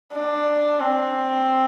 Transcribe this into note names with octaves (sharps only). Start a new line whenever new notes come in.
D4
C4